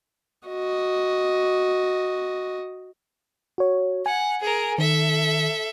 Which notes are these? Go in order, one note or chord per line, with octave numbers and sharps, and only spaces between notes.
F#4 D#5
F#4 C#5
F#5 G#5
G#4 A#4
D#3 A4 E5